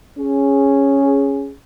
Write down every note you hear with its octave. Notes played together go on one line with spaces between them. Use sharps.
C#4 G#4